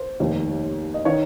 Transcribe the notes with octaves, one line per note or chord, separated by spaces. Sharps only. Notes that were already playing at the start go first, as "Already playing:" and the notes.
Already playing: C5
F1 D#2 D#3
D#5
D#3 C#5